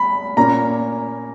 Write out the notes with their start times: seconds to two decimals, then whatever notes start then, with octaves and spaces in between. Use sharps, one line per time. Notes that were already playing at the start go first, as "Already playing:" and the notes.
Already playing: B5
0.37 A#2 A#3 C#4 A#5